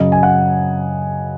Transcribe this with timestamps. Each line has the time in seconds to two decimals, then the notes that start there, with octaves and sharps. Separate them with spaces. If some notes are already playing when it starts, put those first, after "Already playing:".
Already playing: F#2 C#3 D#5
0.12 G#5
0.23 F#5